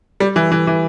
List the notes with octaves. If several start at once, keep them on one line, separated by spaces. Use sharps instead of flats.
G3
E3
E3
E3